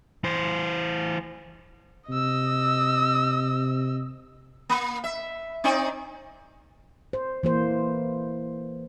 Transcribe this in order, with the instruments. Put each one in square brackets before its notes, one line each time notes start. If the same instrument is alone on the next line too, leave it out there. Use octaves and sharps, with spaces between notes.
[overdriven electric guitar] E3 C5
[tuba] C3 [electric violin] D#5 E6
[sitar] A#3
E5
C4 D#4 D5
[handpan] C5
E3 A#3 C5